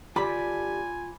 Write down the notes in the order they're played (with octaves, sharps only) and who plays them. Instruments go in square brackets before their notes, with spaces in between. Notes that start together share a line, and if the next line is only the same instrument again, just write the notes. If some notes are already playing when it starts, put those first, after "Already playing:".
[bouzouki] D3 G3 [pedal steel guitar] F4 D6 [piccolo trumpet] G#5 [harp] B5